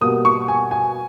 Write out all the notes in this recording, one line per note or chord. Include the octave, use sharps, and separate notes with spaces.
B2 G3 A#3 D#6
C#6
G#5
G#5